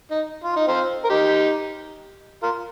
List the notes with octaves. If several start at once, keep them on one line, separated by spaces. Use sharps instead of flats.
D#4
F4
D#4
C4 F4
A#4
D#4 G4
F4 A#4